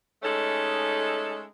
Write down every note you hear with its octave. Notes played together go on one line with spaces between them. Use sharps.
G#3 A3 C#4 D#4 A4